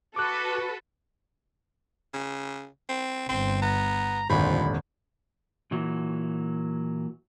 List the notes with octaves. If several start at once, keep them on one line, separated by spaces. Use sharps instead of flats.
F#4 A4 B4 D6 F#6
C#3
C4
G1 C4 C5
B3 A#5
D#1 G#1 F2 D3 F3 B5
A#2 E3 F#3 F#4